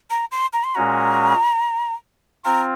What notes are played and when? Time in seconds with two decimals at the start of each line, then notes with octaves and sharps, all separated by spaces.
0.10 A#5
0.32 C6
0.53 A#5
0.64 C6
0.74 A#2 G#3 C#4 F#4 A#5
2.44 C4 F4 A#5